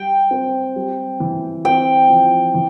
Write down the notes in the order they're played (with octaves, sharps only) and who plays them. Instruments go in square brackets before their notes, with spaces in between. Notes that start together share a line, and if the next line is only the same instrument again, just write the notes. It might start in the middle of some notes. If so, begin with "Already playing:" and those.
Already playing: [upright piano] G3 [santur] G5
[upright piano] C4
G3
E3
[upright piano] C4 [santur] G5
[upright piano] F3
E3